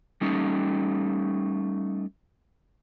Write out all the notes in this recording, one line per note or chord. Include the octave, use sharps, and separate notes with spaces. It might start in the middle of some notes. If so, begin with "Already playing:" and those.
G3 A3 C#4 D#4